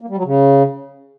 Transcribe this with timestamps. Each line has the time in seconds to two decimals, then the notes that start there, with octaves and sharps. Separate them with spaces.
0.01 A#3
0.09 G3
0.17 F#3
0.25 C#3